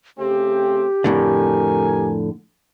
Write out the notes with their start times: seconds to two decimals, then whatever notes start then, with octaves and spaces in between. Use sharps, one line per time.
0.18 C#3 A3 C4 G4
1.04 F2 A2 D3 A#4 G#5